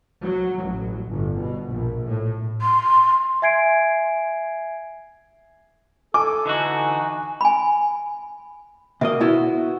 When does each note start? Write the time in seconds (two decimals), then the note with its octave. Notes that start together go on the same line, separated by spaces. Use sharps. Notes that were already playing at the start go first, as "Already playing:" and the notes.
0.22 F#3
0.63 A1
1.08 G1
1.39 B2
1.70 A#1
2.07 A2
2.62 C6
3.42 E5 G#5 G#6 C7 D7
6.14 A4 G#5 D6
6.45 D3 E3 D#4 F#4
7.41 G#5 B5
9.01 B2 A#3 D#5 E5
9.21 B3 E4 F#4